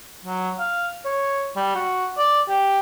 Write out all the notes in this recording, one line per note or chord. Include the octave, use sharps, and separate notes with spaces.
F#3
F5
C#5
G3
F#4
D5
G4